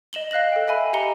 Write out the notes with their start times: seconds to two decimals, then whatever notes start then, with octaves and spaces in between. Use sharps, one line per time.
0.13 D#5 E7 F#7 G7
0.31 D#5 F5 F#6 A#6 F#7
0.52 A4 G5
0.68 A4 E5 G#5 B5
0.93 G4 D#5 A#5 C#7 G7